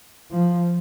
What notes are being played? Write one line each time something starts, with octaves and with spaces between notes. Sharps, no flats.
F3